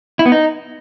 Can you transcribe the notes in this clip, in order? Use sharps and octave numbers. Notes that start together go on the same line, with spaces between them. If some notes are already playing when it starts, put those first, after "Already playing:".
E4
B3
D#4